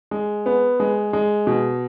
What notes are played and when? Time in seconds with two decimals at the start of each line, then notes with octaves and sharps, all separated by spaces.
0.11 G#3
0.46 B3
0.80 G#3
1.13 G#3
1.47 B2